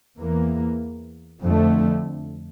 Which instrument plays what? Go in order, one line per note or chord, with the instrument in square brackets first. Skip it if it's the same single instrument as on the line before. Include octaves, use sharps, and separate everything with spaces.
[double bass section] E2 E3 A#3
F2 D3 A3